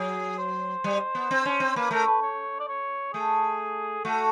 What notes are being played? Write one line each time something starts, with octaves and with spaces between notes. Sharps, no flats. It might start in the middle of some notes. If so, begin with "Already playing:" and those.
Already playing: F#3 G#4
C5
G3
B3
C4
C#4
C4
A#3 B4
A3 A#4
B4
C#5
D5
C#5
A3 G#4
A3 F#4